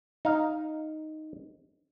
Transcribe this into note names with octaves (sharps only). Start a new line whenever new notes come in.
D#4 F5